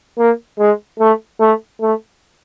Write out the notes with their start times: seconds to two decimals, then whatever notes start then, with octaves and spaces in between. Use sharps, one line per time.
0.18 A#3
0.59 G#3
0.99 A3
1.40 A3
1.81 A3